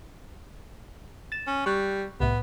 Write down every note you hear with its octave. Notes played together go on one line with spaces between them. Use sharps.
A6 E7
C#4
G3 C#6 F#6
C2 A2 B3